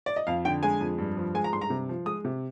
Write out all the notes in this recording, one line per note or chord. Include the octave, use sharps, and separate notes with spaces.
D5
D#5
F2 F5
D3 G5
G#3 G#5
F2
G2
F3
G#3 G#5
A#5
G2 C6
A#5
C3
F3
G#3 D#6
C3